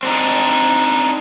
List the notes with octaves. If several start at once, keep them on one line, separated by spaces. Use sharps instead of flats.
C4 D4 D#4